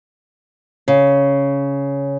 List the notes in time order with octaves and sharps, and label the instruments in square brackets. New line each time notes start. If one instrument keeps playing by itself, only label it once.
[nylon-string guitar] C#3